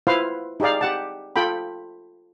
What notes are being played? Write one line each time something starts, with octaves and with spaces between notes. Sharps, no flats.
E4 F4 B4 C5 F5
D#4 G4 G#4 D5 F5
G4 F#5 A5
F4 A4 G5 B5